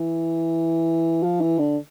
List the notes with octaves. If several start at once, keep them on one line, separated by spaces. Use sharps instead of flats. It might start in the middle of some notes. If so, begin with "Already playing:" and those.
Already playing: E3
F3
E3
D3